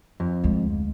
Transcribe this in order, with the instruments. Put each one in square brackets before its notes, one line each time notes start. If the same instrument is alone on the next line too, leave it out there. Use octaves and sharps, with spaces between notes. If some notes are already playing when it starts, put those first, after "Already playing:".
[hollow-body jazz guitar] F2
[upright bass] D2 G#3